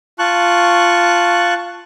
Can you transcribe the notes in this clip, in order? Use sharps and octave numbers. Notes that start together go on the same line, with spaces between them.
F4 A5 C#6 F#6